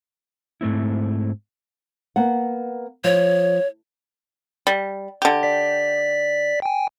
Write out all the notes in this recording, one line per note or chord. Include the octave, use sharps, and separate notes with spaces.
G#2 A3 C4 E4
A#3 B3 F#5
F3 C#5
G3
D3 G4
D5 B6
G5 G#5